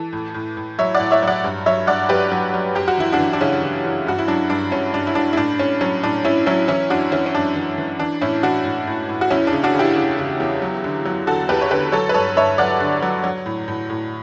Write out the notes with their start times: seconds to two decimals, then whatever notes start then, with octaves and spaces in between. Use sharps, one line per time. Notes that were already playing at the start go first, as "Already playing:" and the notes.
Already playing: E3 A4
0.13 A2
0.34 A2
0.57 A2
0.79 F#3 C#5 E5
0.95 D5 F#5
1.00 A2
1.11 C#5 E5
1.23 F#3 D5 F#5
1.44 G2
1.66 F#3 C#5 E5
1.87 G2 D5 F#5
2.09 F#3 G4 B4
2.32 F#3
2.54 F#3
2.75 F#2 G4
2.88 F#4
2.97 E3 E4
3.12 D4 F#4
3.19 E3
3.33 D4
3.41 C#3 C#4 E4
3.62 E3
3.84 E3
4.07 G2 F#4
4.18 E4
4.28 F#3 D4
4.50 G2 D4
4.72 G2 C#4
4.93 G2 D4
5.07 E4
5.15 G2 D4
5.33 E4
5.37 A2 D4
5.59 A2 C#4
5.81 F#3 C#4
6.03 A2 D4
6.24 A2 C#4 E4
6.46 F#3 C#4 E4
6.68 E3 C#4 E4
6.90 F#2 D4 F#4
7.12 E3 C#4 E4
7.26 C#4
7.34 F#2 D4
7.56 E3
7.78 E3
7.99 E3 D4
8.21 A2 C#4 E4
8.43 E3 D4 F#4
8.65 A2
8.87 A2
9.09 A2
9.21 F#4
9.30 E2 C#4 E4
9.47 D4
9.53 C#3
9.64 D4 F#4
9.74 C#3
9.79 E4 G4
9.96 C#3
10.18 C#3
10.40 E2
10.62 F#3
10.84 D3
11.05 F#3
11.27 D3 F#4 A4
11.49 E2 G4 B4
11.61 C#5
11.71 D3 G4 B4
11.92 F#3 A4 C#5
12.09 B4
12.14 G2 A4 C#5
12.36 G2 C#5 E5
12.58 F#3 D5 F#5
12.80 D3
13.02 F#3
13.24 F#3
13.46 A2
13.68 A2
13.90 A2